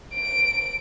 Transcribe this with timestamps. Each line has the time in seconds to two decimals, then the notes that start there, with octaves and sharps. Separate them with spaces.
0.13 D7